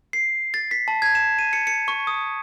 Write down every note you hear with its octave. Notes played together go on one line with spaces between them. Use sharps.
C7
A6
B6
A5
G#6
E7
D#7
C#7
C#7
C#6
D#6